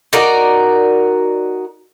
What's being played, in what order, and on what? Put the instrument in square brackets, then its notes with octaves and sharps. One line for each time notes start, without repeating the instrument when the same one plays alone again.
[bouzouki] D#4 F#4 A#4 D5